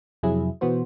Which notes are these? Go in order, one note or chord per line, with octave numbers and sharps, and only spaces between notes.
F2 C3 F#3 E4 G#4
B2 E3 B3 F#4 C5